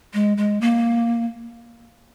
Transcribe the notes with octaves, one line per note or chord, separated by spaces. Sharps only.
G#3
G#3
A#3